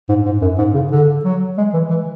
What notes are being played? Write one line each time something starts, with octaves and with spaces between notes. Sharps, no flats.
G#2
G#2
F#2
G#2
C#3
D3
F#3
G#3
E3
E3